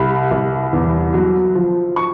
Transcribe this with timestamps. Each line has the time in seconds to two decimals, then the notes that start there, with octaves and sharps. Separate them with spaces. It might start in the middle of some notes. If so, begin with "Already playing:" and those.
Already playing: C2 B5
0.31 C2
0.73 E2
1.14 F#3
1.55 F3
1.96 C#6